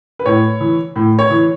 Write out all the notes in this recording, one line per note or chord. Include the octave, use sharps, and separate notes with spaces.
B4
A2 C#5
E3
A2
C#5
E3